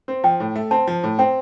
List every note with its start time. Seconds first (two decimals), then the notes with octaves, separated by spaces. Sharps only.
0.08 C4
0.24 F3 G5
0.40 A2
0.56 A3
0.71 C4 A5
0.87 F3
1.03 A2
1.19 C4 G5